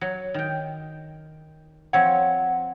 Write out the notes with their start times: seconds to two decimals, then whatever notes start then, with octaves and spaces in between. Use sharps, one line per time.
0.01 F#3
0.34 D#3 G5
1.93 F3 C4 C#5 F#5